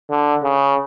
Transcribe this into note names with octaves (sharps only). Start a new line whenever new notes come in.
D3
C#3